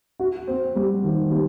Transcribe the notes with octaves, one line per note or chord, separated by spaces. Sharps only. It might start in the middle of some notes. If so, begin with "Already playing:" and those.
F#4
C4
G3
D#3
G3